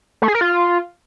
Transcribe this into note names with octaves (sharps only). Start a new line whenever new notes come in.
A3
G#4
A#4
F4